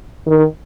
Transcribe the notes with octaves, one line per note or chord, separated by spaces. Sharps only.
D#3